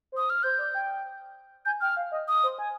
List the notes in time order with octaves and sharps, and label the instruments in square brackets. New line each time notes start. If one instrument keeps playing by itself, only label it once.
[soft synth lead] C5
[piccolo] D#6
F6
[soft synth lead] C5 [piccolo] G6
[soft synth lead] D5
G5
[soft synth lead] G#5 [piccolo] G6
[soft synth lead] G5 [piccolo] F6
[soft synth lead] F5
D#5
[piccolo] D#6
[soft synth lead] C5
G#5